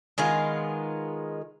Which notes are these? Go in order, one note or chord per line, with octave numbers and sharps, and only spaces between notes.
D#3 G#3 B3 F4